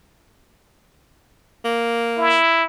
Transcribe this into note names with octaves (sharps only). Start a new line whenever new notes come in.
A#3
E4